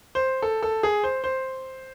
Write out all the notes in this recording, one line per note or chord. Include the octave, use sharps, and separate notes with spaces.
C5
A4
A4
G#4
C5
C5